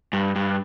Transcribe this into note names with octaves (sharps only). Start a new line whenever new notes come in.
G2
G2